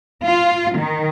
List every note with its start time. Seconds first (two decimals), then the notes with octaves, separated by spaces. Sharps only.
0.24 F4
0.78 D#3